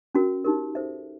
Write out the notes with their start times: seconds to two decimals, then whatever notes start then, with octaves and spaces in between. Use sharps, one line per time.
0.15 C#4 F#4 A#4
0.44 D#4 G4 A#4
0.75 A4 C5 E5